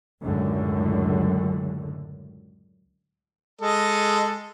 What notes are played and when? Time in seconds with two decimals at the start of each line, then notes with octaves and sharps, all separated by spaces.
0.21 C#2 F#2 A2 D3
3.61 G#3 A4 D#5